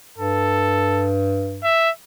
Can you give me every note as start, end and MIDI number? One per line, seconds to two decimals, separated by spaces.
0.18 1.71 43
0.18 1.11 69
1.64 1.90 76